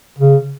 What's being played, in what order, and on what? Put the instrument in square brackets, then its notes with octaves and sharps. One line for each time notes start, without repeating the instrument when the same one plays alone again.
[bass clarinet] C#3